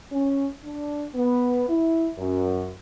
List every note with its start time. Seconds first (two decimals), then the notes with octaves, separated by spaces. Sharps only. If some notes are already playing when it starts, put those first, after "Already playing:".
0.12 C#4
0.64 D4
1.15 B3
1.69 E4
2.19 F#2